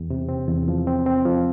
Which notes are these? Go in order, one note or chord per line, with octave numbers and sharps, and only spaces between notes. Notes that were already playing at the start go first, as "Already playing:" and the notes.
Already playing: E2
C3
C4
E2
F3
C4
C4
F3